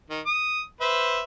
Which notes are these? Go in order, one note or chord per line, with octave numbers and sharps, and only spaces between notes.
D#3
D#6
B4 C5 E5